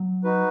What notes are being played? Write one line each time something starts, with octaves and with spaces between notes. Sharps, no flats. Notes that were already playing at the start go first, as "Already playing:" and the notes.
Already playing: F#3
D#4 F#4 B4